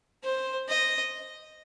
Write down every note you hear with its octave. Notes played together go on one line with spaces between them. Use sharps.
C5
D#5